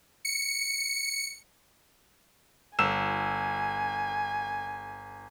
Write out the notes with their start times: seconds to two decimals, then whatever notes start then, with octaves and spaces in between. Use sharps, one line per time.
0.25 C#7
2.79 G1 G#5 E6 E7